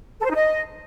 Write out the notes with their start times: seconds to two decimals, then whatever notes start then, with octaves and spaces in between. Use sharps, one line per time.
0.19 A4
0.25 C5
0.30 D#4
0.35 D#5